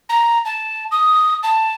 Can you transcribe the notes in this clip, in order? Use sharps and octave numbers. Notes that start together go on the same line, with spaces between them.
A#5
A5
D#6
A5